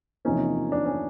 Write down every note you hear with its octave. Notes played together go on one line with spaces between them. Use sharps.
E2 C3 F3 A#3 C#4 D#4
D4
C#4